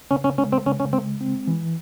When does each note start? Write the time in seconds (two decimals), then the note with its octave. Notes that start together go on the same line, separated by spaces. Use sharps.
0.11 C#3 C#4
0.24 C#4
0.38 G#3 C#4
0.52 C4
0.66 C#3 C#4
0.80 C#4
0.93 G#3 C4
1.21 C4
1.47 E3